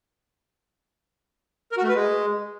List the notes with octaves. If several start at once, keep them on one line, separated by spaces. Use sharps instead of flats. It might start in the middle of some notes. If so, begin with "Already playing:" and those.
A#4
F#4
A3
B4
G#3